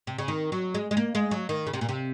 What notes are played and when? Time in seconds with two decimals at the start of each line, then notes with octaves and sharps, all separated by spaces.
0.07 C3
0.18 C#3
0.28 D#3
0.52 F#3
0.74 G#3
0.91 G#3
0.97 A#3
1.15 G#3
1.31 F#3
1.49 D#3
1.67 C#3
1.73 C3
1.81 A#2
1.89 C3